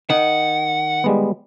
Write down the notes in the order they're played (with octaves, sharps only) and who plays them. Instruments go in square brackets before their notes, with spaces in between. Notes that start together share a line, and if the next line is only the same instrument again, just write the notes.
[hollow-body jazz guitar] D#3 [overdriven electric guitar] F#5
[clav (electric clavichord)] G3 G#3 B3